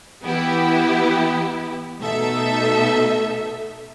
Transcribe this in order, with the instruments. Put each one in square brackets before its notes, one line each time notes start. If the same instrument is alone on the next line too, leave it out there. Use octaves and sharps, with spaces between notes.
[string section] E3 B3 E4 G4
B2 A3 D#4 A4 E5